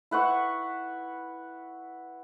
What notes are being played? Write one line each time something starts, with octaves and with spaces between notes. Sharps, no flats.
E4 B4 F#5 C#6